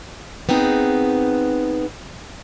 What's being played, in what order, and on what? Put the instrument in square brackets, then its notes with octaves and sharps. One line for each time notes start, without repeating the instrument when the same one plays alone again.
[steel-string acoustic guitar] B3 C4 D#4 G#4